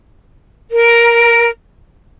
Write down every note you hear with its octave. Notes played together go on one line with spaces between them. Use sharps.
A#4